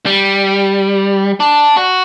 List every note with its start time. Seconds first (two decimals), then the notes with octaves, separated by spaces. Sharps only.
0.06 G3
1.40 D4
1.77 F#4